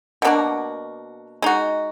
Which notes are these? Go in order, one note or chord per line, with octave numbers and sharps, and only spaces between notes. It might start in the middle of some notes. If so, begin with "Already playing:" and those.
B2 A#3 D4 F#4
G#3 D#4 F#4